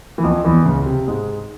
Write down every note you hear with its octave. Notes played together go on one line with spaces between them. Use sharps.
E3
F2 F3
E2 E3
C#2 C#3
C3
G#2 G#3